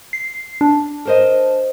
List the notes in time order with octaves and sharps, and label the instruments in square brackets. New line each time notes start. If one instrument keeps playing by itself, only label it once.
[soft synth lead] C7
D4
[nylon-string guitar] A#4 C5 D#5